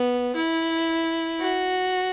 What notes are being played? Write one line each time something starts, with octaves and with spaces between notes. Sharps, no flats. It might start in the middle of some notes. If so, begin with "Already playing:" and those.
Already playing: B3
E4
F#4